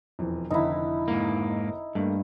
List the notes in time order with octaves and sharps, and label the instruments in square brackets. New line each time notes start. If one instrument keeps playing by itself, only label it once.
[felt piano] E1 F2 E3
[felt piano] F1 D3 D#3 [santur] D#4 E4
[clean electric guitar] G#2 A#3
[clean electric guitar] G2 [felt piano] A3 A#3